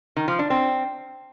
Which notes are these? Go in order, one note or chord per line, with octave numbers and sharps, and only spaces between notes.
D#3
F3
D4
C4